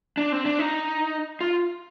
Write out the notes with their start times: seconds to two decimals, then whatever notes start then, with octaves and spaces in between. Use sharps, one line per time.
0.17 D4
0.32 C4
0.46 D4
0.59 D#4
1.41 F4